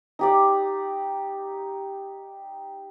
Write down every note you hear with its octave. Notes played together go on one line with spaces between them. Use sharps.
D#4 G4 D5